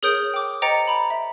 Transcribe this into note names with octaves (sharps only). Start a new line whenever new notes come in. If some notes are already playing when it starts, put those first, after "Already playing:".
G#4 A#4 C#5 D#6 G6 D7
G5 D6
C5 D#5 G5 A#5 A6 C#7
A#5 B5
E5